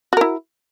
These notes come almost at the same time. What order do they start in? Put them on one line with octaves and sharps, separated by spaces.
F#4 A#4 E4